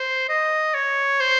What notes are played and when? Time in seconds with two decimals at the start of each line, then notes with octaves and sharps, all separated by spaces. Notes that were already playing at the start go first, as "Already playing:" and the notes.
Already playing: C5
0.29 D#5
0.74 C#5
1.20 C5